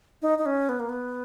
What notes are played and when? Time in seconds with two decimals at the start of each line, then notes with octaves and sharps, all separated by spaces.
0.22 D#4
0.38 D#4
0.46 C#4
0.69 B3
0.80 A#3
0.89 B3